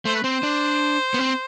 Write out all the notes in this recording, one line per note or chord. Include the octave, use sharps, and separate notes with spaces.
A3 C5
B4
C4 C5
D4
B3
C4